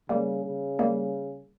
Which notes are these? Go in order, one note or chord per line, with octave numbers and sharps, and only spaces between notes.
C#3 G3 A#3
C#3
G3 A#3